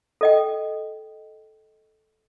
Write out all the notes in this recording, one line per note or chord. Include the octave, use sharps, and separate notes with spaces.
A4 D#5 G5